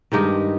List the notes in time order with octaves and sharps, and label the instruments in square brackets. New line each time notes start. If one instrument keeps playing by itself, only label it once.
[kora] G2 D#3 G#3 D#4 G4